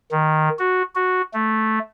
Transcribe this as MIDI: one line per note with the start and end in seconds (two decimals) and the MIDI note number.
0.11 0.49 51
0.59 0.82 66
0.95 1.22 66
1.33 1.79 57